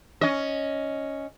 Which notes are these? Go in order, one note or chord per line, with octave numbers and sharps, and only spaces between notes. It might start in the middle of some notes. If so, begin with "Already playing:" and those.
C#4 D#5